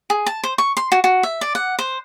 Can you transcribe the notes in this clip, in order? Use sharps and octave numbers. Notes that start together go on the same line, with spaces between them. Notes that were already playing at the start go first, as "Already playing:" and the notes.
G#4
A5
C5
C#6
C6
F#4
F#4
E5
D5
F#5
C5